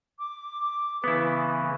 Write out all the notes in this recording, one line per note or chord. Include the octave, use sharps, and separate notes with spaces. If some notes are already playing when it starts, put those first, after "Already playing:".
D6
C#3 E3 B3 E4